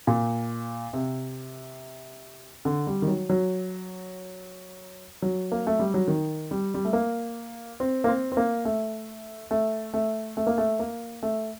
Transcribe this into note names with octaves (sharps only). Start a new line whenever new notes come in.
A#2
C3
D3
G3
D#3
F#3
F#3
F#3
A#3
A3
G3
F#3
D#3
G3
G3
A3
A#3
C4
A#3
C4
C4
A#3
A3
A3
A3
A3
A#3
A3
A#3
A3